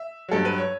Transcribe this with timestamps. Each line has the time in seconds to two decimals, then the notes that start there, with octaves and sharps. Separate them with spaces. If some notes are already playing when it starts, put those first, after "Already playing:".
Already playing: E5
0.29 G2 F#3 A4
0.45 B4
0.58 C#5